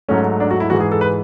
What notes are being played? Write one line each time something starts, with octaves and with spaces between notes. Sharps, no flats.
G#2 F#3 A3 C#4
D4
F#4
E4
G#2 E3 G#3 F#4
G#4
A4
B4